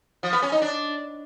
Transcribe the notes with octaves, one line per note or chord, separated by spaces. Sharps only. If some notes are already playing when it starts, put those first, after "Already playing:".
F3
B3
C#4
D#4
D4